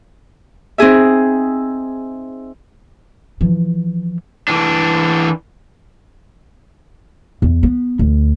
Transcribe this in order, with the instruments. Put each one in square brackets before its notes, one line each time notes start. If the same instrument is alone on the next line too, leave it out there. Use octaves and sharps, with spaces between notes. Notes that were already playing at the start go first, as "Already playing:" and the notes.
[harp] C4 D#4 G#4 E5
[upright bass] E3 F3
[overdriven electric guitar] E3 D4
[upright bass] E2
B3
D2